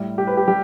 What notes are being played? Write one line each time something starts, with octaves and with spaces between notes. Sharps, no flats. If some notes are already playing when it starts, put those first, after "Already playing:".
Already playing: A2 G3
G4
B4
G4
G3 G4